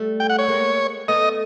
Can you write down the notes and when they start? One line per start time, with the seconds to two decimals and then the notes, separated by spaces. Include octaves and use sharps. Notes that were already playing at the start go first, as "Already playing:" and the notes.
Already playing: G3 A3
0.20 G5
0.30 F#5
0.39 C#5
0.48 G#3 A#3
1.08 A3 B3 D#5